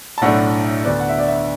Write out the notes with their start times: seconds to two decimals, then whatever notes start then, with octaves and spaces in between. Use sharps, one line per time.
0.18 A5
0.21 B1 A2 A3 D4 F#5
0.84 D2 D3 B3 D4 D5
1.00 F#5
1.09 E5
1.18 D5
1.28 E5